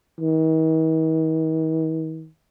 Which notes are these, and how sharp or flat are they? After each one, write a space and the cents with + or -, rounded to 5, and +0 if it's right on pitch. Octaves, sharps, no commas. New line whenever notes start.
D#3 +45